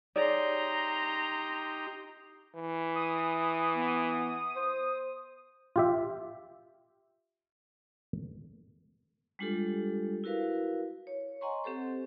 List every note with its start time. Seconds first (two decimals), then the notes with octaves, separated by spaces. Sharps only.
0.16 D#4 G4 G#4 C#5 D5 A#5 C6
2.56 E3
2.95 D#6
3.74 B3
4.56 C5
5.76 F4 G4 E5
9.39 G3 G#3 D4 F4 G4 A4
10.24 E4 F#4 A#4 B4 F5
11.07 C#5
11.41 D#5 F#5 G#5 A#5 C6 C#6
11.64 C4 G4 A4 C5